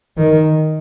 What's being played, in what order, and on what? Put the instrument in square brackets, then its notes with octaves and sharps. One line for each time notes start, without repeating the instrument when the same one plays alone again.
[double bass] D#3